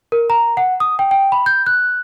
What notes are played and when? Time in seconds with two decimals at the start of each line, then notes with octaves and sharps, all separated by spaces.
0.12 A#4
0.30 A#5
0.57 F#5
0.80 D#6
0.99 G5
1.11 G5
1.32 B5
1.46 G6
1.66 F#6